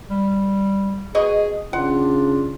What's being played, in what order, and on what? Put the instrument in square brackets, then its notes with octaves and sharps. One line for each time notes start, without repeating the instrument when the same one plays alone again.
[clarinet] G3
[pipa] B2 D#5 C#6 [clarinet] G#4
[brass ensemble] C#3 D4 [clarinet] F4 [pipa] F#5